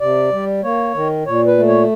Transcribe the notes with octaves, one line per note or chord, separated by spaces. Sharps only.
C3 D5
G3
A#3 C#5
D#3
A#2 C#5
B4
A3
C#5